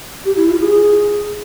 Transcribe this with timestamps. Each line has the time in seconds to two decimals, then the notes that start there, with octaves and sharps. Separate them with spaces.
0.25 G4
0.36 E4
0.48 F4
0.60 G#4